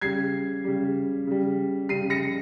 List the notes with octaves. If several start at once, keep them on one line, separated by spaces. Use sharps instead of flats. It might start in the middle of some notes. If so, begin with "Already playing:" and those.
C#3 G3 G#6 C7
C#3 G3
C#3 G3
C#3 G3 C7 D#7
A#6 C#7